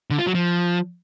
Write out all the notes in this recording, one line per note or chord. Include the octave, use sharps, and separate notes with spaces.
D3
F4
F#3
F3